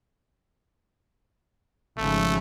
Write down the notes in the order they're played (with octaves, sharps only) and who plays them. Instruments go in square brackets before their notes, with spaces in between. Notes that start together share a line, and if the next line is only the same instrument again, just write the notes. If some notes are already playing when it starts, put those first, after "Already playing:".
[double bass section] G#1 C#3 F3 [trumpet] A3